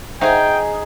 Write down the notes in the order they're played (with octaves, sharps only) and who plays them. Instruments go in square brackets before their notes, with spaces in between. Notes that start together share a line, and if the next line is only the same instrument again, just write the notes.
[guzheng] D#4 G#4 [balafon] C5 E5 F#5 [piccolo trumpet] G5